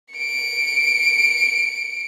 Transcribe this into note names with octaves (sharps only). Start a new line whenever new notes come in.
C#7 D7